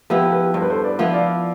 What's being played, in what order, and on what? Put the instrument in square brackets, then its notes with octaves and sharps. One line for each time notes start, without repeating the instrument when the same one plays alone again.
[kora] F3 B3 E4 [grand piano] G4 B4
[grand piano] G4 B4
[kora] G2 [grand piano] C5
[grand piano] B4
A4 C5
B4 D5
[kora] F3 B3 E4
[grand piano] D5 F5